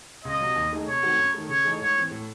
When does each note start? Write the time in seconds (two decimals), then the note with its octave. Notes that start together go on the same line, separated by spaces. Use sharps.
0.25 C#2 D#5
0.41 C3 F#3
0.56 D#2
0.72 D#3 A3 D#4 G#4
0.87 C3 C#5
1.03 D#3 A3 C4 F#4
1.18 F#2
1.34 D#3 A3
1.49 C#3 C#5
1.65 E3 A3 D#4 G#4
1.80 G#2 C#5
1.96 E3 C4
2.11 A2